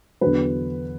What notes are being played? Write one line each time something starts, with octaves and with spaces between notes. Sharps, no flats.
E2 D3 F#3 B4